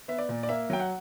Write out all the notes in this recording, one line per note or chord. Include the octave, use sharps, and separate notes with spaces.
B3 E5
D5
A#2
D5
A#3 E5
F#3 G5
F#5